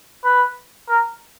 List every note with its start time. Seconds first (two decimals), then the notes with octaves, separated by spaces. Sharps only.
0.24 B4
0.88 A#4